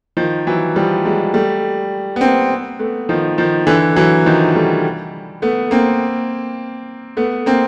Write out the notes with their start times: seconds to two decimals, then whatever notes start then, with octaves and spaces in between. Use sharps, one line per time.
0.17 D#3 F3
0.47 E3 F#3
0.76 F3 G3
1.05 F#3 G#3
1.34 G3 A3
2.16 B3
2.21 A#3 C4
2.79 A3 B3
3.09 D#3 F3
3.38 D#3 F3
3.67 D3 E3
3.96 E3 F#3
4.26 D#3 F3
4.55 G3 A3
5.42 A3 B3
5.71 A#3 C4
7.17 A3 B3
7.46 A#3 C4